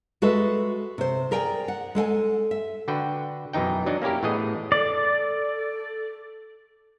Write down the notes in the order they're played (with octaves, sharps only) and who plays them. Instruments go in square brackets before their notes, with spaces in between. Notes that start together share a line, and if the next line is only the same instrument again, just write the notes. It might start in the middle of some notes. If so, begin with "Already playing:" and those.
[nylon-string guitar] G#3 F#4 G#4 A4 B4 E5
C3 C5
G#4 A#4 D5 G5 G#5
F#5
G#3 A4 G5 G#5
E5
[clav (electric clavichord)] D3 F#4 B4 G5
F#2 B2 E3 D#4 G5
F#3 D4 D#4
A#3 C#4 E4 G4 A#4
A2 E3 B3 G#4 D#5
[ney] A4 [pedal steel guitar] D5